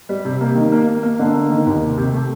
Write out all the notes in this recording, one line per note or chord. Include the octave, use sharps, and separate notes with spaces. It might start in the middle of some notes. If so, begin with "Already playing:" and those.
G3
C3
A#3
D#3
A#3
A#3
A#3
D3
A#3
D#3
D#2
C3
C3
A3